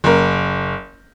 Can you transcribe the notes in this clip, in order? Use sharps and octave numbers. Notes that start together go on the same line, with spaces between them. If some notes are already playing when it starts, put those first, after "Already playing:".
F#1 A#4